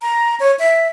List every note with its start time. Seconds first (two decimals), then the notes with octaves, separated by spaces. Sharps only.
0.02 A#5
0.40 C#5
0.59 E5